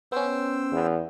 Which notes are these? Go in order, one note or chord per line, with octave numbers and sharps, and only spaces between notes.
B3 C#4 C5 G5 E6
E2